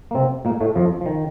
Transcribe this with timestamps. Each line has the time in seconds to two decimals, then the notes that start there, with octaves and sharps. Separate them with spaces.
0.11 A#3
0.15 C3 C4
0.45 A#2 A#3
0.61 A2 A3
0.76 F2 F3
1.01 F3
1.06 D#3